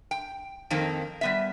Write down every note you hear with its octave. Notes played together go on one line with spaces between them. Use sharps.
G5
F2 D#3 A#3 C4
G3 B3 E5